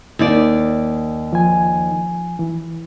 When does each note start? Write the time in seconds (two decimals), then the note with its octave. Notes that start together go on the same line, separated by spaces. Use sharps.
0.19 D#2 D#4 D5
1.33 F3 G#5
2.39 E3